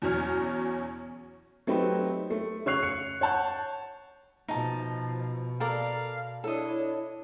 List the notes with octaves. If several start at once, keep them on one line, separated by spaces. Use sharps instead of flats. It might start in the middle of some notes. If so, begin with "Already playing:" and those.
E2 B2 F#3 C#4 C#5 F6
F#3 A3 C4 D#4 G4 B4
A3
C#3 C#5 C#6 F#6 C7 F7
C#7
C#5 F#5 A5 G6
B2 F3 D#4 A5
A4 A#4 D5 F5
D4 E4 A4 C#5 D#5